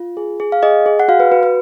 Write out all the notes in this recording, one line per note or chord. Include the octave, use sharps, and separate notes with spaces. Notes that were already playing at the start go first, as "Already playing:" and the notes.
Already playing: F4
G#4
G#4
F5
G#4 D#5
G#4
F#5
F#4 F5
B4
F#4 B4
B4